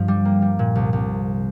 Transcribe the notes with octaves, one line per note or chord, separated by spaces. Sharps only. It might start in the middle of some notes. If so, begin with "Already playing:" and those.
Already playing: G2 F3
G3
A#3
G3
A#2
C2
C2